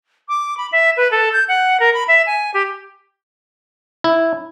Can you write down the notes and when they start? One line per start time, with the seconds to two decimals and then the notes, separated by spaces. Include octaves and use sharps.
0.28 D6
0.57 B5
0.72 E5
0.97 B4
1.11 A4
1.33 G6
1.48 F#5
1.80 A#4
1.93 B5
2.08 E5
2.26 G#5
2.54 G4
4.04 E4